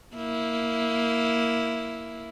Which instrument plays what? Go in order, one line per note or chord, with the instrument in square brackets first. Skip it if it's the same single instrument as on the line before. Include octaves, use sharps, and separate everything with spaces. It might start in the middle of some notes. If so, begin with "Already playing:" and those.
[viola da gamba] A#3 E4